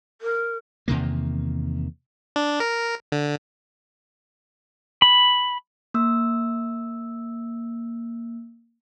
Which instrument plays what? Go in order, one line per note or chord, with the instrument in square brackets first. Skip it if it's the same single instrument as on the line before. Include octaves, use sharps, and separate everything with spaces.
[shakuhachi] A#4
[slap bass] E2 C3 D#3 A#3
[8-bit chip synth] D4
A#4
D3
[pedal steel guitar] B5
[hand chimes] A#3 E6